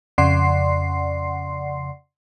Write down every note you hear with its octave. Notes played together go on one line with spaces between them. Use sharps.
F2 C#3 D5 F#5 C6 C7